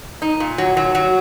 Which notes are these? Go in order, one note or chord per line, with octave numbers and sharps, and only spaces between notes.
D#4
A#2
F#3
F#3
F#3